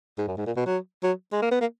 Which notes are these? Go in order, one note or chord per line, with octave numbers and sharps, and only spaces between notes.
G#2
F#2
G#2
A#2
B2
F#3
F#3
G#3
A#3
B3
A#3